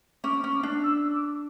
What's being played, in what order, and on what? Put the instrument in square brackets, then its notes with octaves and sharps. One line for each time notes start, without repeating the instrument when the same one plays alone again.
[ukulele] C#4 [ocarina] D6
[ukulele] C#4
[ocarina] D6
[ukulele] D4
[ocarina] E6
D6